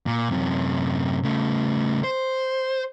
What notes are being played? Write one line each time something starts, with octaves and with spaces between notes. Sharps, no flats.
A#2
F#2 C3
C#3 A3
C5